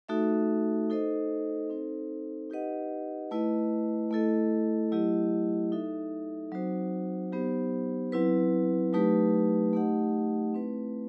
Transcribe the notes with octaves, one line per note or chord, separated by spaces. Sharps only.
A3 D#4 F#4 A4 E5
D#4 A4 C5 D#5
C4 D#4 A4 C5
D#4 G4 B4 D#5 F#5
A3 E4 B4 D#5
A3 E4 A4 D#5
F#3 A3 E4 G4 D#5
D#4 A4 E5
F#3 C4 D#4 F#4 C5
F#3 B3 D#4 G4 C5
F#3 C4 E4 B4
F#3 A3 D#4 G4 B4
A3 D#4 G4 D#5 F#5
A3 C4 E4 B4